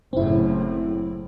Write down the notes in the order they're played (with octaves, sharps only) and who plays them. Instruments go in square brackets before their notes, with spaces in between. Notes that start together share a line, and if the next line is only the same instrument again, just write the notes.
[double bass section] F#1 A2 [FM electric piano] C4 E4